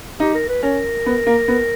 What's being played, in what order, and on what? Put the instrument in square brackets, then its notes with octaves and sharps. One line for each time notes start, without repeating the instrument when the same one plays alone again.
[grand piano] D#4 [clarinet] G4
[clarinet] A#4
B4
[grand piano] C#4 [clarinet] A#4
[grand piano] B3
A#3
B3